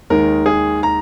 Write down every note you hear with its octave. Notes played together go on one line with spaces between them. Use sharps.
D#2 D#3 G#3 D#4 A#4
G#4
A#5